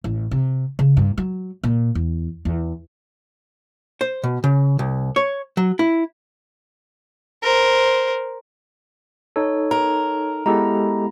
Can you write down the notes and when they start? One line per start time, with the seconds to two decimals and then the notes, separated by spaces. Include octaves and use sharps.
0.04 A1
0.31 C3
0.79 C#3
0.97 G2
1.18 F#3
1.63 A#2
1.95 E2
2.45 E2
4.01 C5
4.24 B2
4.44 C#3
4.79 C2
5.16 C#5
5.57 F#3
5.79 E4
7.43 A#4 C5
9.36 D#4 A4 C#5
9.71 A#4
10.46 G#3 B3 E4 G4 A4 A#5